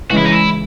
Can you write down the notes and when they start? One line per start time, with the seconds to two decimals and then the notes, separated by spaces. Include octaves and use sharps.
0.11 C#3 E3 G#3 F#4
0.18 E4
0.26 D#4
0.32 E4